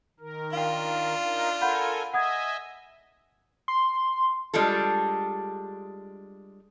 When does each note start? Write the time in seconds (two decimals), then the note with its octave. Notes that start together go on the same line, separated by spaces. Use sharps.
0.20 D#3 A#4
0.53 D4 F4 F5 G5
1.24 D#4 A#4
1.62 A4 A#4 F#5 G#5 B5 G6
2.13 D#5 E5 F#5 G#5 D#6 G#6
3.68 C6
4.54 G3 G#3 D4 F4 A4